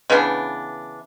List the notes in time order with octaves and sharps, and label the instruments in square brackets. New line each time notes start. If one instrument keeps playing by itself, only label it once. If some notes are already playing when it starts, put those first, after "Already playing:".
[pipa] C#3 E3 B3 D4